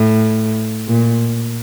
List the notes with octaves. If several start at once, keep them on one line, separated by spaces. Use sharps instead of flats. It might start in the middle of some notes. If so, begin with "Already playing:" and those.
Already playing: A2
A#2